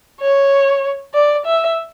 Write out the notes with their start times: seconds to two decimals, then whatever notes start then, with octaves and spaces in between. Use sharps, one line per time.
0.21 C#5
1.14 D5
1.46 E5